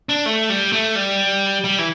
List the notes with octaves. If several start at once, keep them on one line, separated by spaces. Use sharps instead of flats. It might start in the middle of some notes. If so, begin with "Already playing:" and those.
D4
A3
G3
A3
G3
G3
E3